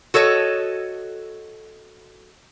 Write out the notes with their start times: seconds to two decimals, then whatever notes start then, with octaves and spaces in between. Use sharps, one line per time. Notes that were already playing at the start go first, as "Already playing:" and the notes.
0.14 F#4 A4 C#5 D#5